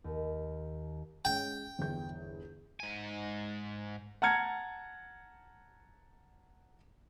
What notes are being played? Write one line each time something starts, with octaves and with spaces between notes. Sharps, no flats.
D#2
G#3 C#4 G5
G1 E2 G6
G#2 G#5
F#5 A5 A#5 F6 G#6 C#7